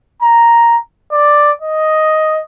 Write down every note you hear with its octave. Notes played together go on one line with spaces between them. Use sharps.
A#5
D5
D#5